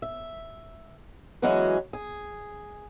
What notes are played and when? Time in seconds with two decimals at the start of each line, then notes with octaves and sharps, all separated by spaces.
0.02 E5
1.42 E3 F#3 G#3 C#4 F#4 B4
1.93 G#4